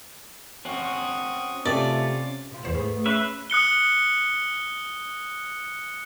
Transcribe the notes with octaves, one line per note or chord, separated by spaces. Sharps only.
C4 C#4 F#4 C#6 D#6
C3 A3 C#4 F4 D5
C3 F4
E2 B3 C5 E7
G#2 A3 B3 G#4
C#4 B4 E5 C7
D#6 F#6 C#7 G7